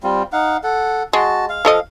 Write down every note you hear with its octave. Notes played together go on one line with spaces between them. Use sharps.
G3 C4 F4
D#4 F5 F#5
A4 F#5
G#3 F#4 A5
F5
F3 A4 D#5